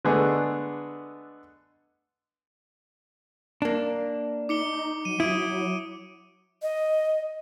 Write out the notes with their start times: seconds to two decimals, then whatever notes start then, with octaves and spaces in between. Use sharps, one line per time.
0.05 D3 G#3 A3 B3 D4 G#4
3.62 A#3 D4
4.49 D#4 D6 C#7 G7
5.05 F#3 D#7
5.20 F#3 E4 D#6 D7 D#7
6.62 D#5